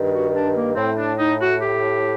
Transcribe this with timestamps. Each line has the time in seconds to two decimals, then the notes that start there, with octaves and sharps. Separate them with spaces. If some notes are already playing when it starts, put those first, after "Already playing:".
Already playing: G2 D#3
0.12 F#4
0.34 D4
0.55 A#3
0.76 A2 C4
0.97 D4
1.18 D#4
1.40 F#4
1.61 G4